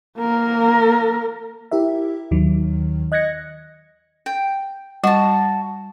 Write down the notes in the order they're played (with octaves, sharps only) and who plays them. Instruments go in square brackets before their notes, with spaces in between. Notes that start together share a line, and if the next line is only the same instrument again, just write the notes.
[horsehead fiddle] A#3 A#4
[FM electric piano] E4 G4 A#4 E5
D#2 D#3 F#3
D#5 F#6 G#6 A#6 C#7
[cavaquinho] G5
[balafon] G3 [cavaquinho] F#4 A5